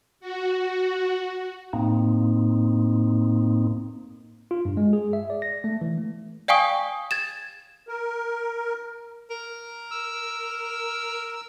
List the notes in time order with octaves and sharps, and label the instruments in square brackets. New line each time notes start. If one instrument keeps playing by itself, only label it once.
[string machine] F#4
[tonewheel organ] A2 A#3 C4 D#4
[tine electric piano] F4
G2
G#3
G#4
E5
D5
A#6
A3
E3
A3
[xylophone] D5 F5 G5 G#5 C#6 D#6
G#6 A6 E7
[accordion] A#4
[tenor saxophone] A#4
[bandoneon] E6